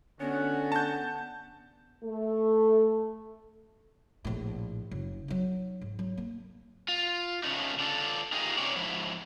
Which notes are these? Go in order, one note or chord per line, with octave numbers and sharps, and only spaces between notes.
D3 B3 C#4 F#4
A5 G6
A3 A4
A#1 A2
F#1
F#3 D#4
G#2
F#3
A#3
F4
C#3 A3 C#4 D#4
D3 D4 F4 A4
D#4 F4 G4 G#4 A#4 D#5
C3 C#4 D#4 C#5 D5
G#2 F3 E4